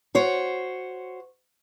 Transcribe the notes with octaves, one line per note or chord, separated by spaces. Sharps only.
F#4 C5 C#5